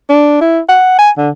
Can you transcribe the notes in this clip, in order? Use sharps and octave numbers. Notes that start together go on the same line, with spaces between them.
D4
E4
F#5
G#5
D3